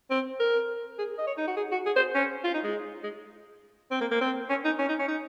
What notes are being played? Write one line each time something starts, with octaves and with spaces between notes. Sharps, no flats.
C4
A#4
G#4
D#5
C#5
D#4
F#4
G#4
F#4
G#4
C5
C#4
F4
D#4
G#3
G#3
C4
A#3
A#3
C4
C#4
D#4
C#4
D#4
C#4
D#4